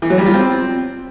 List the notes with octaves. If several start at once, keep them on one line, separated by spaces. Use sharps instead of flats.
E3
F#3
G3
F4
C4